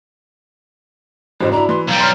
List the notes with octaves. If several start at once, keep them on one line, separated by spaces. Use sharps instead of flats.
A1 G#2 C#3 F#4 C5
D4 E4 A#5
E3 C6
B1 G3 B4 F5 A#5
B4 C#5 A#5 C6 F6 C7